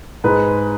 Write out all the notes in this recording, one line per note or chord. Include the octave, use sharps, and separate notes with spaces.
G#2 G#3 B4